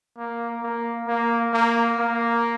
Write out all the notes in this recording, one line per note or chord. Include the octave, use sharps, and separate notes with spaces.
A#3
A#3
A#3
A#3
A#3